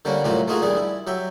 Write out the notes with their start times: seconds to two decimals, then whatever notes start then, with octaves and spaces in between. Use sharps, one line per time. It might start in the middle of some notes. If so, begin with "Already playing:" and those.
0.05 D3 G3 A#3 C#4 D4
0.24 F#2 A2 C3 A#3 F4 F#4
0.48 A3 A#3 D#4 F4 F#4 G#4
0.62 A#1 D#3 G3 D4 G#4
0.77 E4
1.07 F#3 G4 E5